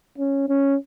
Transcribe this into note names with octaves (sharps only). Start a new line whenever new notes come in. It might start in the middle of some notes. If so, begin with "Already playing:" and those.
C#4
C#4